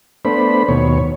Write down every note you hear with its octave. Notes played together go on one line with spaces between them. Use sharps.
A3 B3 D4 C5 B5
D#2 B2 C#5